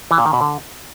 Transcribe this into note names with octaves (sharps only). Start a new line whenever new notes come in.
E3
A#2
D#3
B2
D3